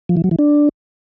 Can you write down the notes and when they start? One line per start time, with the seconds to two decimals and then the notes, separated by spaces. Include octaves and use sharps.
0.09 F3
0.17 E3
0.24 F#3
0.31 E3
0.39 D4